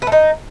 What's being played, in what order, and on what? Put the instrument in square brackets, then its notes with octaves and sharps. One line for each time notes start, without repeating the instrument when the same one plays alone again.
[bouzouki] B4
A3
D#4